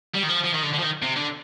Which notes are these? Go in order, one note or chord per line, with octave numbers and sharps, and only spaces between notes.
G3
D#3
F3
F3
D#3
D3
D3
F3
D#3
C3
D3